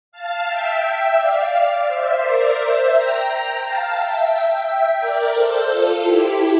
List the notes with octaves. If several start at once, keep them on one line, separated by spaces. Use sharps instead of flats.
F5 A5
E5 G5
D5 F5
C5 E5
A#4 D5
C5 E5
G5 A#5
G5 A#5
F5 A5
E5 G5
A#4 D5
A4 C5
F4 A4
E4 G4